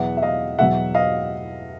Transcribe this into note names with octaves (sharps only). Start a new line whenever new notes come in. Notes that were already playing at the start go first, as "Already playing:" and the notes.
Already playing: E2 B2 F#3 E5 F#5
E5
D#5 F5
E2 B2 F#3 E5 F#5
D#5 F5